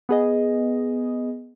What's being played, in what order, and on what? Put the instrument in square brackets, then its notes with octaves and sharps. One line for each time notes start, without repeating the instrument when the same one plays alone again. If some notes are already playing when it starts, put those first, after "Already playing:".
[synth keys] B3 G#4 D#5